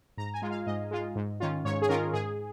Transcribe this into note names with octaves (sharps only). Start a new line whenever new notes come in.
G#2 A#5
G#5
G#3 F4
F5
G#2 D#5
G#3 F4
G#2
D#3 C#4 F4
G#2 C#5
G#4
D#3 C#4 F4 A#4
G#2 G#4